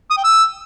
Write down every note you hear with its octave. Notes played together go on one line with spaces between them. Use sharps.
D#6
G5
E6